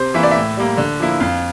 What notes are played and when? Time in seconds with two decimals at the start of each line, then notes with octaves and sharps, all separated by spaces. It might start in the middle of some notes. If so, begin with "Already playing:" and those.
Already playing: C3 C5
0.14 E3 A#3 E4 E5
0.23 D5
0.31 A2 E5
0.57 G3 A#3
0.77 D3
1.00 F3 A#3 E4
1.20 F2 F5